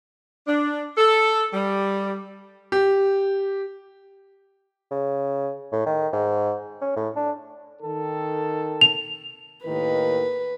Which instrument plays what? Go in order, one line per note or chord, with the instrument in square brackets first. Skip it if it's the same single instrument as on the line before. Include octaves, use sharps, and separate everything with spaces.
[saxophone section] D4
A4
G3
[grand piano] G4
[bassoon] C#3
A2
D#3
G#2
C#4
A2
D4
[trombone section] D#3 A4
[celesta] F7
[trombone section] D#2 A2 D#3 [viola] B4